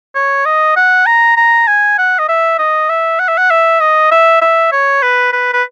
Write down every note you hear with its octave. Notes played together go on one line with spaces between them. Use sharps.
C#5
D#5
F#5
A#5
A#5
G#5
F#5
D#5
E5
D#5
E5
F#5
E5
F#5
E5
D#5
E5
E5
C#5
B4
B4
B4